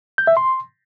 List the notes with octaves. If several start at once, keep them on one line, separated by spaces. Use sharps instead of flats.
G6
E5
C6